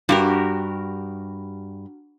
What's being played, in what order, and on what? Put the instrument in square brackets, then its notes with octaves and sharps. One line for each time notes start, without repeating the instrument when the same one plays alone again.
[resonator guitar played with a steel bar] G2 [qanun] F#4 G4 A#4